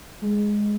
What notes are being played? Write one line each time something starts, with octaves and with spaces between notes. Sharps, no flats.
G#3